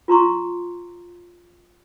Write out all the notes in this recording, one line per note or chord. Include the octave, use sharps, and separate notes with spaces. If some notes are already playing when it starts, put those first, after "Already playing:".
F4 A#5 C6 C#6